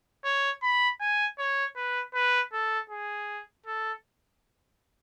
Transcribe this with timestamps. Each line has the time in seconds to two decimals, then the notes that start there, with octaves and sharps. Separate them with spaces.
0.24 C#5
0.62 B5
1.00 G#5
1.38 C#5
1.76 B4
2.14 B4
2.53 A4
2.90 G#4
3.66 A4